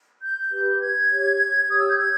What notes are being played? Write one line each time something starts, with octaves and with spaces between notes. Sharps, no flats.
G6
G4 B4
G#6
G4 C#5
G4 C#5 D#6
E6
G6
G#6